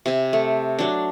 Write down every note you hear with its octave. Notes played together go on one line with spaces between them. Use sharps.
C3 E5 G#5
A3
F#3 D4